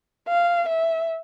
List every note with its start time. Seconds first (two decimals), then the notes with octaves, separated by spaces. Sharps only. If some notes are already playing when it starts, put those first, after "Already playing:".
0.28 F5
0.68 E5